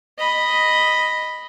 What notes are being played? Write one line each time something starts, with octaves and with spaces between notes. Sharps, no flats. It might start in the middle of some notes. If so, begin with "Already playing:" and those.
D#5 B5